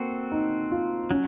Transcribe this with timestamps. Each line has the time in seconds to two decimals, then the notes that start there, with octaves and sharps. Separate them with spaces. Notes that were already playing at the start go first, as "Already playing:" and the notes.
Already playing: A#3 C4 F#4 A4
0.32 D#4
0.72 F4
1.11 F#3 C#4